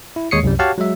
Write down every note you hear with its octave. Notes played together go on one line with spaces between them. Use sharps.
E4
D#2 G#3 C#5 D#6 C7 C#7
C2 F#2 G3
F#4 G4 C#5 F5 F#5 A5
F#3 G#3 E5